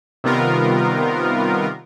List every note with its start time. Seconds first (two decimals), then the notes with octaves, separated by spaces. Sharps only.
0.24 C3 D#3 G3 B3 F4 A#4